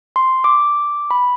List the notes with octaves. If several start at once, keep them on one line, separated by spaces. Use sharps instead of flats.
C6
D6
B5